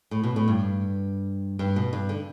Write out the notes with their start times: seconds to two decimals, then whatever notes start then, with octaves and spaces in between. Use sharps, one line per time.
0.11 A2
0.24 B2
0.36 A2
0.48 G2
1.59 G2
1.76 B2
1.93 G2
2.09 D3